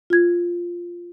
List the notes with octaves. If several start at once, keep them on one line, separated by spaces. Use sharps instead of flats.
F4 G#6